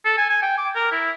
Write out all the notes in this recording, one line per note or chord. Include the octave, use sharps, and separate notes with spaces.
A4
G#5
G#5
G5
D6
A#4
E4